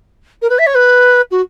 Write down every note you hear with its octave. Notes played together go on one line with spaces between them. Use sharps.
A#4
B4
E5
C#5
B4
F#4